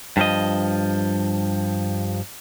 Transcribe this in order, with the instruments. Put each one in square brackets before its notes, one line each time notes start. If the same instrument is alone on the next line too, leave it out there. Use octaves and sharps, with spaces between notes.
[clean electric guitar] G2 F3 D#5